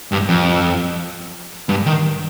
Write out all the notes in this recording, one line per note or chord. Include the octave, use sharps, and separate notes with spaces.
G2
F2
G2
D#3